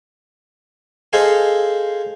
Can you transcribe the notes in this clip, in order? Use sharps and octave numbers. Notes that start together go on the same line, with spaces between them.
G#4 A4 C5 D#5 F5 G#5